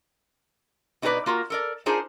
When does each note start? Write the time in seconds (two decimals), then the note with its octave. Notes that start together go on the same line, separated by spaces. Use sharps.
1.02 B2 D#4 G4 A4 B4 D5
1.26 A#3 F4 F#4 A#4
1.50 A4 A#4 D5
1.86 D4 D#4 F4 G#4 A#4 C5